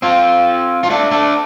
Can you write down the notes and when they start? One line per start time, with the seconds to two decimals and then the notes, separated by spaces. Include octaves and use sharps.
0.02 C4 F4
0.83 F4
0.90 A3 D4
1.11 A3 D4